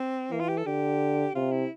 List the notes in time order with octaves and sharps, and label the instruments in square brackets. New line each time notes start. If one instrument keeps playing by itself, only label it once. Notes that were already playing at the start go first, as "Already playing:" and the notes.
Already playing: [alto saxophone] C4
[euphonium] E3 [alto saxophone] A#3
[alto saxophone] F4
G4
A4
[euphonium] D3 [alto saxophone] G4
[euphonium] C3 [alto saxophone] F4
[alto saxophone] E4